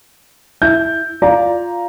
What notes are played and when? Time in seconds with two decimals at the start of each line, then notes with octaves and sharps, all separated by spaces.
0.62 E4 G6
1.22 F4 D5 A#5